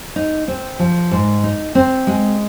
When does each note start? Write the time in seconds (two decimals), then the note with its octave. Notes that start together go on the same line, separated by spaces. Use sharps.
0.16 D#4
0.48 C4
0.79 F3
1.11 G#2
1.43 D#4
1.75 C4
2.07 G#3